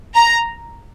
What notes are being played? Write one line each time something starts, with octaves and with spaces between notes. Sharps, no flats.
A#5